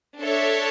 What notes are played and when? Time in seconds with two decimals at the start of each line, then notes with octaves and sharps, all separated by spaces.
0.20 D4 A4 C#5 E5